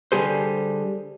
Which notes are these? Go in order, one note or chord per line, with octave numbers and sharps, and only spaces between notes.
D3 G3 G#4 C5